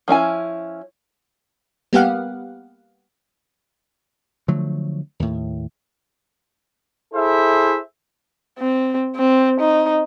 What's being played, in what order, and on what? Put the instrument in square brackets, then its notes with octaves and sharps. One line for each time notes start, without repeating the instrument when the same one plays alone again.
[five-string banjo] F3 C#4 E4 G#5
[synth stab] G3 A#3 B3 G4 F5 F#5
[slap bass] D3 F3 F#3 A3
D#2 A2
[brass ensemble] E4 G#4 A4 C5 E5
[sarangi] C4
C4
D#4